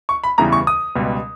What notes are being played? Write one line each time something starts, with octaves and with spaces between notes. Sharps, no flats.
C#6
B5
E2 C#3 E3 G3 A#5
C#6
D#6
C#2 B2 G3